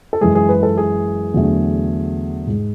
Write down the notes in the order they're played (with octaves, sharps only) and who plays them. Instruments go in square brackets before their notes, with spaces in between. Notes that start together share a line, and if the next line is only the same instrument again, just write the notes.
[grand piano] A4
F#2 E3 G#3 G#4
G#4
B4
A4
G#4
E2 D3 F#3 A3
G#2 G#3